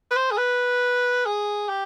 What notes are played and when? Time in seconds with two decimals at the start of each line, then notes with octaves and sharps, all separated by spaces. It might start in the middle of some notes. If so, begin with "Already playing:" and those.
0.11 B4
0.16 C5
0.31 G#4
0.37 B4
1.26 G#4
1.69 G4